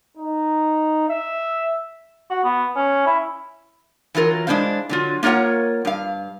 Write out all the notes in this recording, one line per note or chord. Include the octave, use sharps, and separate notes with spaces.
D#4
E5
F#4
B3
C#4
E4
E3 F#3 F4 A#4
G#3 A#3 D4 E4 C5 F5
D3 F#3 F4
A#3 F4 A#4 C#5 F#5
G2 F5